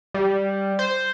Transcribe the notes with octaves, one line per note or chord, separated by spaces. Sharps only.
G3
C5